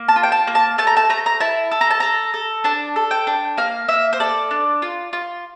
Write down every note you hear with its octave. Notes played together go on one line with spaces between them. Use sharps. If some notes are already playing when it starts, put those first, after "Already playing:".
Already playing: A#3
A5
F4
G5
A5
A#3
A5
A3 A5
A#5
A5
A3 A#5
A#5
E4 A5
A4
A#5
A5
A4 A#5
A4
D4 A5
A4
G5
D4
A#3 F5
A#3 E5
C5
A4 D5
D4
F4
F4